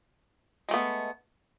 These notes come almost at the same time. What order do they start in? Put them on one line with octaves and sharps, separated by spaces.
G#3 A3 B3